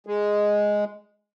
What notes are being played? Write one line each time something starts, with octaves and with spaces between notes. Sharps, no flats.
G#3